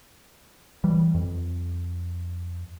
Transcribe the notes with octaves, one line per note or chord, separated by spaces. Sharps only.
E3 G3
F2